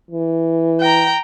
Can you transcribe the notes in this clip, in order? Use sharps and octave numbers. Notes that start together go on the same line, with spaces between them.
E3
G5 A#5